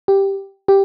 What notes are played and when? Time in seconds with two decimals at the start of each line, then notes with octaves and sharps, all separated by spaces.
0.08 G4
0.68 G4